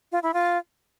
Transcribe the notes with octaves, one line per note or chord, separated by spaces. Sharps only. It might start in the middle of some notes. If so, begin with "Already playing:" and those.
F4
E4
F4